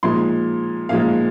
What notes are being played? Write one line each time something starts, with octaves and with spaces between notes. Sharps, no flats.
A#2 F3 G#3 D#4 C6
A#2 F3 G#3 D#4 F5